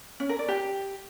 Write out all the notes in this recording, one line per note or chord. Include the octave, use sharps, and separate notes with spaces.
C#4
A#4
D5
G4